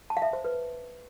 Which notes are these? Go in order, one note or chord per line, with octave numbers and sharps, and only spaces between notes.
A5
F5
E5
C5
B4